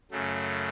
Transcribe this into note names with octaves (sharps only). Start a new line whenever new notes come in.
F#2 C#3 F#3 A3